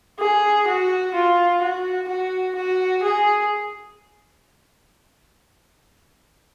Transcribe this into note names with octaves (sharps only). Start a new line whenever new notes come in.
G#4
F#4
F4
F#4
F#4
F#4
G#4